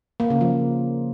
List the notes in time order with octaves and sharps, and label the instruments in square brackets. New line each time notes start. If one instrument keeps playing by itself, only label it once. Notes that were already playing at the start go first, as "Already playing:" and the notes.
[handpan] A#3
C#3
F3